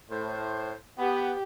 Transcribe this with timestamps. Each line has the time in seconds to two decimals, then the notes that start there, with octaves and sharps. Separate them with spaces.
0.11 A2 C5
0.99 B3 G4